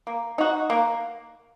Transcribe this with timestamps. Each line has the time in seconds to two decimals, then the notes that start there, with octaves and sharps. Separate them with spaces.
0.07 A#3
0.38 D#4 F#4
0.70 A#3